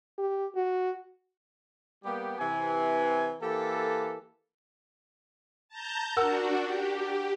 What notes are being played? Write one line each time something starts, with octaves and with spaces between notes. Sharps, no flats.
G4
F#4
G3 A#3 B3 G4
C3 E3 G#5
E3 A#3 G4 A4
A5 A#5 G6
D4 F#4 A#4 F#5 E6
G4